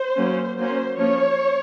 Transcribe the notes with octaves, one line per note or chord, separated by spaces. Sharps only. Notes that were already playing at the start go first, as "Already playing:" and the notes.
Already playing: C5
F#3 A#3 C#4
F#3 A#3 C#4 C5
F3 A#3 C#4 C#5